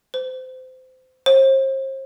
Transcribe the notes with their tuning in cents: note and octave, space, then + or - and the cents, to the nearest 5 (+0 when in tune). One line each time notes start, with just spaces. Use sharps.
C5 -25
C5 +40